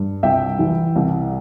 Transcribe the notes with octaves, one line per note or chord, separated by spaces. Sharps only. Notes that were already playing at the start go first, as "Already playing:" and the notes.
Already playing: G2
C2 E5 G5
E3
C2